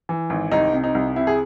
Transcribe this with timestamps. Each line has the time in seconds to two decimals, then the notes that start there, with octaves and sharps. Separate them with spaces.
0.09 E3
0.30 G#1
0.52 C2 D#4
0.73 C3
0.84 D#4
0.95 C2
1.16 C3 E4
1.27 G#4